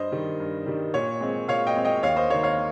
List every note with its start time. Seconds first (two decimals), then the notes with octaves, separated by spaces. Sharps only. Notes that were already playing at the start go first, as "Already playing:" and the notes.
Already playing: G2 C5 D#5
0.12 D#3 G3
0.40 G2
0.66 D#3 G3
0.94 A#2 C#5
1.21 G#3 C4
1.48 A#2 C#5 F5
1.67 D#5 G5
1.76 G#3 C4
1.85 D#5 G5
2.03 D#2 C#5 F5
2.16 C5 D#5
2.30 D#3 A#3 C#5
2.43 C#5 F5